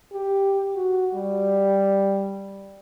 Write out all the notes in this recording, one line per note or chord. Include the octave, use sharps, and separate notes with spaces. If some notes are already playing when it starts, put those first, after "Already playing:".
G4
F#4
G3